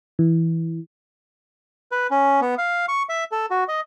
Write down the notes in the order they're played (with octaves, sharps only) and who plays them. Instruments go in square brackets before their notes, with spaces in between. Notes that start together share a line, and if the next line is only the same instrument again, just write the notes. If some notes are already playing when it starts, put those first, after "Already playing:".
[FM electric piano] E3
[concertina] B4
C#4
B3
F5
C#6
E5
A4
F#4
D#5